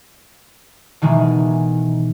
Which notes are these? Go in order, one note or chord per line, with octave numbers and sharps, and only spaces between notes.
B2 D#3 E3 G#3